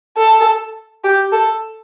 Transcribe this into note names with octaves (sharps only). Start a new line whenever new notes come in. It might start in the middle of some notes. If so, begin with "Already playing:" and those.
A4
G4
A4